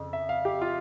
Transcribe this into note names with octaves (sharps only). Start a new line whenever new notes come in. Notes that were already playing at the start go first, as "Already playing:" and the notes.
Already playing: F2 C#3
E5
F5
G4
F4